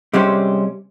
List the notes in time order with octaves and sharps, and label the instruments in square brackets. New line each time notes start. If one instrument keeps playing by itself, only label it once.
[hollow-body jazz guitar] C3 G3 G#3 C4 C#4 G4